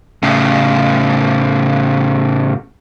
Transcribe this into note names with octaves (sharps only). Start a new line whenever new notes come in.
A2 C#3